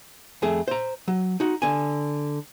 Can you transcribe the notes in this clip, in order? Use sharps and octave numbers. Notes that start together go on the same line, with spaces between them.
F2 A3 G#4
C5 A#5
F#3
D#4 F#4
D3 G#5